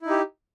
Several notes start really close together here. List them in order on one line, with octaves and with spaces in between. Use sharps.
E4 D#4 G4